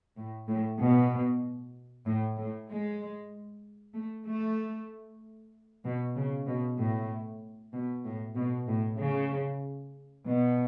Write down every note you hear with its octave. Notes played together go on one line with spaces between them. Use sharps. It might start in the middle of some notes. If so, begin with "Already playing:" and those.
A2
A2
B2
A2
A2
G#3
A3
A3
B2
C#3
B2
A2
B2
A2
B2
A2
C#3
B2